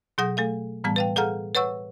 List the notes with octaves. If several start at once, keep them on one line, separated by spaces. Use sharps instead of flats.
B2 F#3 G#4 F#5 D#6 A#6
A3 A4 F5
A2 E3 G3 B3 A5
B4 F5 G5
G#4 A4 F5 F#5 A#5 F6
B4 C#5 F#5 C#6 E6